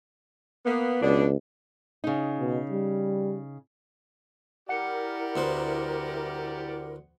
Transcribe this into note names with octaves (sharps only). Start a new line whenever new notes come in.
A#3 B3
C#2 B2 B3 D4
C#3 D#4
B2
G3
E4 G4 A#4 D5 F#5 C#7
D2 B3 C5